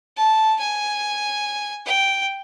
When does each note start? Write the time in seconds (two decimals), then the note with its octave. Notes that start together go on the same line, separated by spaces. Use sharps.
0.17 A5
0.60 G#5
1.86 G5